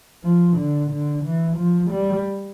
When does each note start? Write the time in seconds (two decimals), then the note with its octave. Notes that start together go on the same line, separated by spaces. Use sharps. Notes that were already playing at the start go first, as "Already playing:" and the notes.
0.24 F3
0.57 D3
0.91 D3
1.24 E3
1.57 F3
1.91 G3